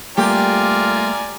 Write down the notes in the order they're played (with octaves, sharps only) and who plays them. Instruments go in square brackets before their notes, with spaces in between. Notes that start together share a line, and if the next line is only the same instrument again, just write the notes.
[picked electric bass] G3 A3 A#3 [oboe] F4 [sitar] G4 [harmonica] D5 G#5 A#5